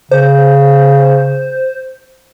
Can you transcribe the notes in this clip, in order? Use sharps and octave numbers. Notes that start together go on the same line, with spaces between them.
C#3 C5